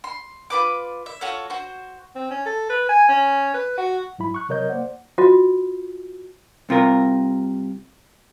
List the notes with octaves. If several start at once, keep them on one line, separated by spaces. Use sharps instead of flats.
C6
F4 G#4 B4 D6
E5
F4 F#4 A4 C#5
F#4 C5
C4
C#4
A4
B4
G#5
C#4
B4
F#4
G#2 F#3 E4 B5
C#6 F#6
C3 F#3 A#4 C#5 D#5 G6
A#3 C5 D5 F#5
F4 F#4 D#5
C2 C3 F4 A#4